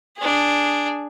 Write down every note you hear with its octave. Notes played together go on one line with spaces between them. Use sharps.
D4 G#4